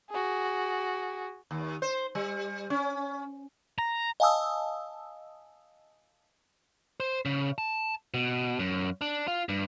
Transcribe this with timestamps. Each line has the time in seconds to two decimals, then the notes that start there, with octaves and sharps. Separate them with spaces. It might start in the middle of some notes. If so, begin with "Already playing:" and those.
0.10 F#4 G#4
1.51 D#2
1.82 C5
2.15 G3
2.70 C#4
3.78 A#5
4.20 D#5 F5 G#5 A5 D#6 E6
7.00 C5
7.25 C#3
7.58 A5
8.14 B2
8.59 F#2
9.01 D4
9.28 F4
9.49 G2